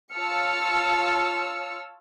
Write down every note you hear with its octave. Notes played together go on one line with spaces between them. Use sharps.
F4 C#5 A5 E6 F6 C#7